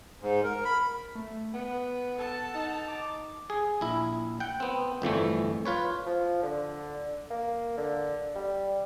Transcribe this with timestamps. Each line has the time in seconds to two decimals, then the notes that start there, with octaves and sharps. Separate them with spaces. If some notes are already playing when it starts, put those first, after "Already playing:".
0.22 G#2
0.44 A#4
0.65 B5
1.15 A3
1.54 B3 F#5
2.17 A4 A5
2.55 D#4
2.88 D6
3.50 G#4
3.81 A#1 E4
4.40 F#5 G5
4.60 B3 C4
5.02 G1 F2 E3 A3
5.65 F4 B4 C#5
6.06 F3
6.43 D3
7.31 A#3
7.78 D3
8.36 G3